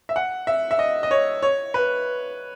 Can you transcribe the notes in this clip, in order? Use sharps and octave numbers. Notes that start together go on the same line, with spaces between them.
E5
F#5
E5
E5
D#5
D#5
C#5
C#5
B4